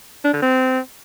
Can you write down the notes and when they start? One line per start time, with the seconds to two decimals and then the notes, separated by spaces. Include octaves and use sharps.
0.24 D4
0.33 D3
0.42 C4